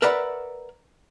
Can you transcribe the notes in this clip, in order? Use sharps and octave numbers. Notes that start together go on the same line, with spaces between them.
A#4 B4 D5 E5 F#5 B5